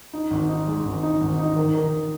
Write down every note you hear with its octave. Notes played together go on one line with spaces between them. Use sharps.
D#4
G#1
D#4
G#3
G#1
D#4
G#1
D#4
D#3
D#3